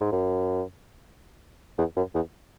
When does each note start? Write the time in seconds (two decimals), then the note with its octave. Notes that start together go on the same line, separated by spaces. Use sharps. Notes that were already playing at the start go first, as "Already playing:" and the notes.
0.01 G#2
0.12 F#2
1.78 E2
1.96 F#2
2.15 E2